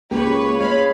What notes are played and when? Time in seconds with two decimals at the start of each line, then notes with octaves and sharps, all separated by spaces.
0.11 C#2 A#3 G4 B4 C#5
0.60 G#3 C#5 F5 B5